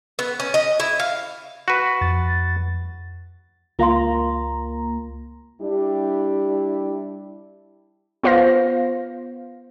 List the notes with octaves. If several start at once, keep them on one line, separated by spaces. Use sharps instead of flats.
B3
C#4
D#5
E4
F5
F#4 B4
F2 A6
C#2 A#3 F4 F5 A#5 C6
G3 D4 E4 G4
B3 F4 C5 F5 A#6